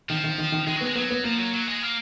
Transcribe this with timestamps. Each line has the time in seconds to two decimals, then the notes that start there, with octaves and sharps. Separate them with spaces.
0.09 D#3 F3
0.24 D#3
0.38 D#3
0.52 D#3
0.67 D#3 G#3
0.76 F#3
0.81 B3
0.86 G#3
0.95 F#3 B3
1.10 B3
1.24 F3 A#3
1.38 F#3
1.53 F#3
1.67 G#3
1.82 A#3